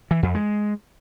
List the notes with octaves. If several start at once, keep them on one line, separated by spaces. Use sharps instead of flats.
E3
F2
G#3